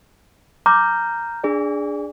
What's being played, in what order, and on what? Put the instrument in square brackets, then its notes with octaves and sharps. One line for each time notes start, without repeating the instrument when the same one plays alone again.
[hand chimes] A#5 F6 G6 [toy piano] D6
[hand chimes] D4 G#4 D5